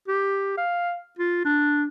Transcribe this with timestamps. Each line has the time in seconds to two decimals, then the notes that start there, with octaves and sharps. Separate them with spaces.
0.08 G4
0.57 F5
1.19 F4
1.45 D4